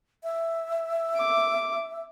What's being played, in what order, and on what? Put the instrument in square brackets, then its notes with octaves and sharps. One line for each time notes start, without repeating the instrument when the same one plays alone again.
[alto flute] E5
[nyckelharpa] D6